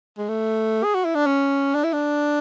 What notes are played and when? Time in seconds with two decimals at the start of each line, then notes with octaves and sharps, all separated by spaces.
0.18 G#3
0.28 A3
0.83 G#4
0.94 F#4
1.05 E4
1.15 D4
1.26 C#4
1.74 D4
1.83 E4
1.93 D4